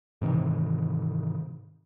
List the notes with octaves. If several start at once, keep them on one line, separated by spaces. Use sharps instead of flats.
G#2 C3 D#3 E3